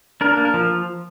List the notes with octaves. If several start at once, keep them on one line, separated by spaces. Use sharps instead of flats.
D4 A#4
A#3
A#4
F3